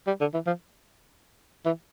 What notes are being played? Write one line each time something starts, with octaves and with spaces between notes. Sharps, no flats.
G3
D3
E3
F3
E3